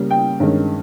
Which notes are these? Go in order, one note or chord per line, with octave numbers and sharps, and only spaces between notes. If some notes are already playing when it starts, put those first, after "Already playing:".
Already playing: C#3 G3 A#3 C#4
G5
G2 D#3 G#3 C#4